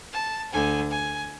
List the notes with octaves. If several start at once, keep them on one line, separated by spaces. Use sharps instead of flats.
A5
D2 D3 G#5
G#5